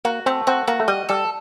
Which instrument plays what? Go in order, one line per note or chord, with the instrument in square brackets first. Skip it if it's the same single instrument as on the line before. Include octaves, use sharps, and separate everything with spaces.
[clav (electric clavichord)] A#3 [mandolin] F#4
[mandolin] A3 [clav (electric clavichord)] C4
[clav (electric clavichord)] C4 [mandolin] F#4
[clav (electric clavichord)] A#3 [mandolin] F#4
[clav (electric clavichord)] A3
[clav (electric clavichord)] G3 [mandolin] D#5
[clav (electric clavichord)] G3 [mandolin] A4